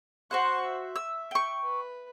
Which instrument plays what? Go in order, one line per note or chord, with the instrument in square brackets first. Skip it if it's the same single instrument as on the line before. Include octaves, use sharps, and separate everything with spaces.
[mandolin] F#4 C5 F#5 [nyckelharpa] C6 C#6
[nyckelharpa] E5
[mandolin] E6
G5 C#6
[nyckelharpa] B4